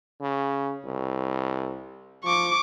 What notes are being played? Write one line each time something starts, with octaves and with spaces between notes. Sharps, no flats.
C#3
C2
F3 C#6 D6